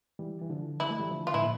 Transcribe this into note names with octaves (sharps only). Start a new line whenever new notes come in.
E3 G3
E3
D3 F3
G3 E4
A3
E3 G3
D3 F3
F4
A2 E4
A#2